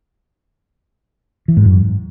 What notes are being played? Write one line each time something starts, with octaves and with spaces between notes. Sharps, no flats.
E3
G#2
F#2